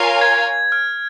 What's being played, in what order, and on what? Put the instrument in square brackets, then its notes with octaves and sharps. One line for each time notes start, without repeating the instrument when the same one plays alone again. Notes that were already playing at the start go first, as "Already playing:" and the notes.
Already playing: [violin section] F4 A#4 C#5 F5 G#5
[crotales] G#6
F6